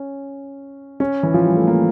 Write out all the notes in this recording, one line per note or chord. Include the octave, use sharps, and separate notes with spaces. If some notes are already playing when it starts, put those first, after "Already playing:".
Already playing: C#4
C#4
E3
F3
G3
A3
A#3